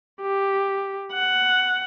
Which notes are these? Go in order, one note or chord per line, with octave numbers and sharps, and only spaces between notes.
G4
F#5